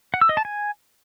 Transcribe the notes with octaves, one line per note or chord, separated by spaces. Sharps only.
F#5
E6
D#5
A5
G#5